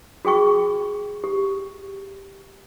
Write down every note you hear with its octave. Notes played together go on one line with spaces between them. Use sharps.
F#4 G#4 G5 C#6
G4